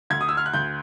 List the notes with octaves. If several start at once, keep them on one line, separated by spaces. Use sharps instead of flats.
D2 G#6
D#6
E6
F6
F#6
D2 G6